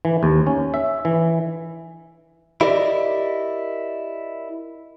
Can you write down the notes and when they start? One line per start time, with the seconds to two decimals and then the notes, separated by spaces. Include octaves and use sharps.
0.05 E3
0.23 D#2
0.47 C#4
0.74 E5
1.05 E3
2.61 E4 G4 A#4 D5 D#5